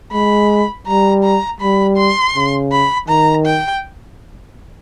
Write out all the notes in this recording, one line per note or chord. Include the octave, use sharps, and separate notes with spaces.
G#3 B5
G3 A#5
A#5
G3 B5
C6
C#3
B5
D#3 A#5
G5